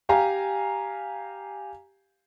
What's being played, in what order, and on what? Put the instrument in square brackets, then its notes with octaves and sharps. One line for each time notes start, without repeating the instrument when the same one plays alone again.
[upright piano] G4 F5 G#5 A#5